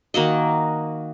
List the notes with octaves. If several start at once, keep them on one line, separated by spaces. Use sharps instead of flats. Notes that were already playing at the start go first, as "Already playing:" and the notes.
D#3 A#3 F#4 D#5